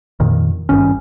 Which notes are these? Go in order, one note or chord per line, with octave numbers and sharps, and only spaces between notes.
F2 A#2 D#3
G#1 G2 D#3 C#4